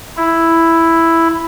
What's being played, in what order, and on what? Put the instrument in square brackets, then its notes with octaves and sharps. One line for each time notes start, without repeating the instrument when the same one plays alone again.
[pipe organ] E4